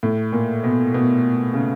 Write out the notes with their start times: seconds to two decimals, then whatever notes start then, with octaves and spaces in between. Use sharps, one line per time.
0.03 A2
0.33 A#2
0.64 B2
0.94 B2
1.54 C#3